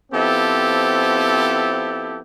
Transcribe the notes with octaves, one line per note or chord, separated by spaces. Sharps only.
F3 B3 C4 E4 G4 A4